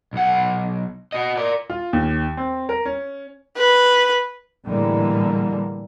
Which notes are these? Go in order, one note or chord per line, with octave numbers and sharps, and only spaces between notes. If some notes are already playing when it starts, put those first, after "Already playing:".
B1 F#5
F#4 D#5
A#4 D5
F4
D#2
C4
A#4
C#4
B4
A2 D3 E3 G3 G#3 A#3